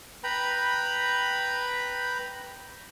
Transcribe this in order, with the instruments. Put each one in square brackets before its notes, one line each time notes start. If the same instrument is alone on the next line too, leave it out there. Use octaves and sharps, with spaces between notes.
[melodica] B4 G5 A#5 B5